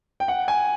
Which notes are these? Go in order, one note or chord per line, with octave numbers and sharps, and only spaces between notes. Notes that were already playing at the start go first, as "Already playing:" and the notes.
G5
F#5
G#5